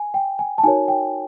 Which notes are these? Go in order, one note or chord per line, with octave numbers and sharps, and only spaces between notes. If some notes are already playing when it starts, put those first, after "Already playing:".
Already playing: G#5
G5
G#5
A5
D#4 F#4 A#4 C#5 G#5
G5